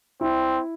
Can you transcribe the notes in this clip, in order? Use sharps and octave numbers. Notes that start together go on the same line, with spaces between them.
C4 E4